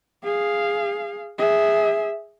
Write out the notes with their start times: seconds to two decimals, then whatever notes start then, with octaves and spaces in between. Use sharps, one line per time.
0.24 G#4 F5
1.38 G#4 E5